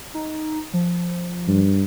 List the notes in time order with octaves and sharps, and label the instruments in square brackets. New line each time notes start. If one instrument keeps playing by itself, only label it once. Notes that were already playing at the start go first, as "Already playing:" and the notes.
[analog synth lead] D#4
F3
[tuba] G2